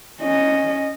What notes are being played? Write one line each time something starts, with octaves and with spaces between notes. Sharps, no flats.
C#4 D#5